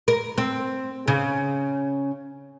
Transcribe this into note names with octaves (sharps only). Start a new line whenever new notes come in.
A#4
C4
C#3